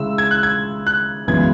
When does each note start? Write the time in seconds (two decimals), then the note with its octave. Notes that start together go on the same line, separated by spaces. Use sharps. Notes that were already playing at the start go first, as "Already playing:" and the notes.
Already playing: C#3 G#3 C#4 E4 E6
0.18 G#6
0.31 F#6
0.43 G#6
0.87 F#6
1.28 F#2 C#3 E3 G#3 B3 G#6